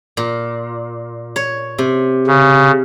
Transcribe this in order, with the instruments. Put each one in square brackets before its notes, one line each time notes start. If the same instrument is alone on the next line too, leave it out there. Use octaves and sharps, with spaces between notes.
[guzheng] A#2
C#5
C3
[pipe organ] C#3